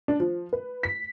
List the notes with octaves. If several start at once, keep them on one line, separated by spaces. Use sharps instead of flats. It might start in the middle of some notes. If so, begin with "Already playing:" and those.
D4
F3
B4
B6